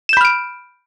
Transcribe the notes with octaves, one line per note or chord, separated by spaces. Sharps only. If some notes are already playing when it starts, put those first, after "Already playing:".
B5 F6 G6 D7 E7